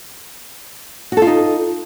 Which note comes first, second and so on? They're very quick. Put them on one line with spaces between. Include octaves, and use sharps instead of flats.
F#4 A4 F4 D#4